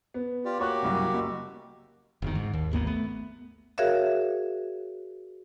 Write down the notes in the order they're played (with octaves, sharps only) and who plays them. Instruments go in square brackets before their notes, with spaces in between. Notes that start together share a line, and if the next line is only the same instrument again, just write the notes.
[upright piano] B3
[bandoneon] F4 G4 D5
[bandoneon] A#3 F#4 G4 [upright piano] C#5 C#6 F#6
[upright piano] C2 F#2 C#3
F#1
[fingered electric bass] F#1 E2 D#3
G#2
D#2
G#1 D#2 A#3 B3
A3 B3
[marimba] F#4 G#4 A#4 C#5 E5 F5